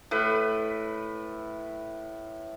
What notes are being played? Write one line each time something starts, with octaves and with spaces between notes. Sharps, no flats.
A2 B4